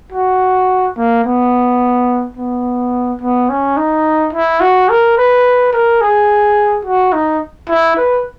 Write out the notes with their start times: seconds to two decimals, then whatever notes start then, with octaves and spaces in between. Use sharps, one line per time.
0.13 F#4
0.97 A#3
1.24 B3
2.37 B3
3.21 B3
3.50 C#4
3.77 D#4
4.33 E4
4.61 F#4
4.89 A#4
5.17 B4
5.73 A#4
6.01 G#4
6.85 F#4
7.13 D#4
7.69 E4
7.97 B4